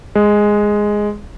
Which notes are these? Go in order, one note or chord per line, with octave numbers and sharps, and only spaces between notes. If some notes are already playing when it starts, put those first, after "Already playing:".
G#3